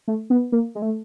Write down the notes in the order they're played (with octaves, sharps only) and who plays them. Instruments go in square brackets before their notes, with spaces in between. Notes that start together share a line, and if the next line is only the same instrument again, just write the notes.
[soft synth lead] A3
B3
A#3
G#3
A3